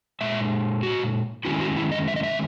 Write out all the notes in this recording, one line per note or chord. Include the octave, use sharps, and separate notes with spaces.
A#2 G#3 E5
F#4
D#3 G#3 C#4 E4 F#4
F#4
E4
D#5
E5
D#5
E5